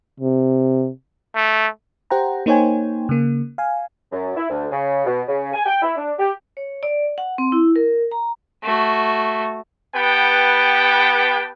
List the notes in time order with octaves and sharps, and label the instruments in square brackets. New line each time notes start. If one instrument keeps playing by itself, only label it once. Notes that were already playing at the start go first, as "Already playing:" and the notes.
[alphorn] C3
[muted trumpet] A3
[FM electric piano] G4 C5 F#5 G5 A#5
A#3 D#4 C5 C#5 G5 G#5
C#3 A#3
F5 G#5
[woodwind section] F#2
E4
D2
C#3
B2
C#3
G#5
G5
E4
D4
G4
[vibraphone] C#5
D5
F#5
C4
E4
A#4
A#5
[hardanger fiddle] A3 F#4
[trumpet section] B3 G4 B4 F#5 G5 A5